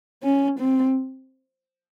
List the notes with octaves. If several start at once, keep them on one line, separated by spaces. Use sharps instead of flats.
C#4
C4